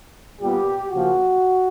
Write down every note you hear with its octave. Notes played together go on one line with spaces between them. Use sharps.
A#2 G3 B3 G4
C#3 F3 A#3 F#4